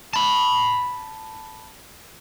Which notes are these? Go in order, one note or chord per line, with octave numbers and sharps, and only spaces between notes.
A5 B5